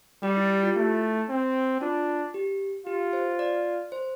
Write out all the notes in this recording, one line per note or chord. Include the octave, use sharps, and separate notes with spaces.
G3 G4
E4
G4
F4
A3 E4
C4
D4 F4
G4
F4 G4
C5
D5
C5